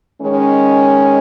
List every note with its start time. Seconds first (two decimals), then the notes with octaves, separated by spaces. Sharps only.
0.21 D#3 G#3 C#4